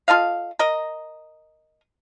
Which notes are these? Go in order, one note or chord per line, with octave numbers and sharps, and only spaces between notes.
F4 A4 D#5 F5
A#4 D#5